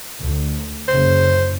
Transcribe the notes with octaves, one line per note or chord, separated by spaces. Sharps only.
D2
F#1 C#3 C5